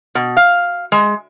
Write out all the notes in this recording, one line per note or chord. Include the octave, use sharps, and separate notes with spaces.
B2
F5
G#3